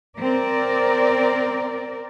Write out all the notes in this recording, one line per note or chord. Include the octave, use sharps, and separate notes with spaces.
C4 A#4 D5